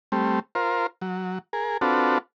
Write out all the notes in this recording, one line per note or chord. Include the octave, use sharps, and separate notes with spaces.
G3 A3 C4
F4 A#4 C5
F#3
G#4 A#4
C4 D4 F4 F#4 A4 B4